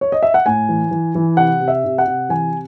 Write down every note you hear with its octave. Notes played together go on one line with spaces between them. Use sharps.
C#5
D#5
E5
F#5
A2 G#5
E3
E3
E3
C3 F#5
C3
E5
C3
F#5
C3
E3 G#5